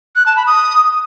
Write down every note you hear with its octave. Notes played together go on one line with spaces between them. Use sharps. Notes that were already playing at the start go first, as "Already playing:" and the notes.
F#6
A5
B5
D#6